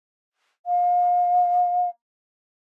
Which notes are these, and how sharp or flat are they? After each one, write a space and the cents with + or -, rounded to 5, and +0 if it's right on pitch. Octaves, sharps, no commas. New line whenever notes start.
F5 +30